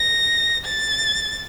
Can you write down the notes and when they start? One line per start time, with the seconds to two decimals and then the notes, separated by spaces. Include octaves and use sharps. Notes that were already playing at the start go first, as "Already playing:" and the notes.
Already playing: A#6
0.65 A6